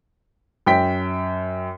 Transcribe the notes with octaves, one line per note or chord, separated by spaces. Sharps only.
F#2 G5 B6